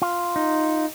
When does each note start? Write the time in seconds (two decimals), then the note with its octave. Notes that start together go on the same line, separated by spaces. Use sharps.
0.02 F4
0.36 D#4